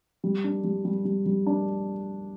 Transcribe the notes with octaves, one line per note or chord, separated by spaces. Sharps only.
G3
D4
G3
G3
G3
G3
D4